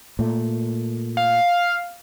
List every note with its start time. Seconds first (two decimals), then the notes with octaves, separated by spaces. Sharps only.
0.19 A#2 A3
1.17 F5